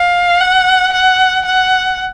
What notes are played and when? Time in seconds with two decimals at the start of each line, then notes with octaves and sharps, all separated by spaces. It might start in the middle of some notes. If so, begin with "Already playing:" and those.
Already playing: F5
0.40 F#5
0.93 F#5
1.46 F#5